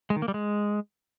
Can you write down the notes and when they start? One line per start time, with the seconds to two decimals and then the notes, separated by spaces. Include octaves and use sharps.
0.10 G#3
0.16 D#3
0.22 A#3
0.28 G3
0.34 G#3